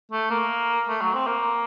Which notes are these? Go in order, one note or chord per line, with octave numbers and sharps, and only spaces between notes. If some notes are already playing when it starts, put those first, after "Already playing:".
A3
A#3
A3
F#3
C4
A#3